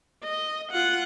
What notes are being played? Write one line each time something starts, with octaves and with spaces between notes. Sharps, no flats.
D#5
F4 F#5